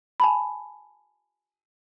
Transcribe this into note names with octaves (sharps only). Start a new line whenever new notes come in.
G#5 A5 B5